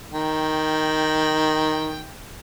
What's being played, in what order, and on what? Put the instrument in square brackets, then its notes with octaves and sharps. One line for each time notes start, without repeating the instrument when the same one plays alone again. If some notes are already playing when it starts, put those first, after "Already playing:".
[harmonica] D#3 G5